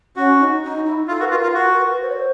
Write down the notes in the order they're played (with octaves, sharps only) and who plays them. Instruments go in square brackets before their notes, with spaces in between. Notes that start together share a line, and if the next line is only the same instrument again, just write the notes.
[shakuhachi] C#4 [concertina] F#4
[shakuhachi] D#4
D#4
E4
[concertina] F4 [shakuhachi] A4
[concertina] F#4 [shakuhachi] B4
[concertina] F4 [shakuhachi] A#4
[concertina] F4
[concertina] F#4 [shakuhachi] A#4
[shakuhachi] B4
C5
C#5
C5